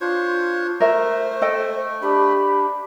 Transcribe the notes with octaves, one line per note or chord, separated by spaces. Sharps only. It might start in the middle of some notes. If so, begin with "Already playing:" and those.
D4 F4 C5 C#5
A3 A#4 C5 E5
A4 D#5 G5
D4 G4 B5